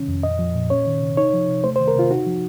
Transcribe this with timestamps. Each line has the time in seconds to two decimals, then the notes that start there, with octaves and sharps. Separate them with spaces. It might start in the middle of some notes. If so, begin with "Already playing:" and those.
Already playing: C3 D#3 C#4
0.08 F2
0.23 A#2 D#5
0.39 F3
0.55 A#2
0.70 C#4 C#5
0.86 D#3
1.01 C3
1.17 D#4 C#5
1.33 F3
1.48 C3
1.64 A3 C5
1.76 C5
1.80 D#3
1.88 A#4
1.95 C3 F4
2.11 D#4 F#4
2.26 F3